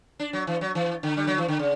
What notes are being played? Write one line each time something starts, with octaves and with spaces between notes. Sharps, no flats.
D4
F#3
E3
F#3
E3
D3
G3
F#3
E3
D3
C#3